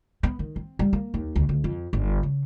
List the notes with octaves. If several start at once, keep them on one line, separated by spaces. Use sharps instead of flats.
B3
D#3
C4
G3
A#3
D#2
D2
D2
F2
G1
C#3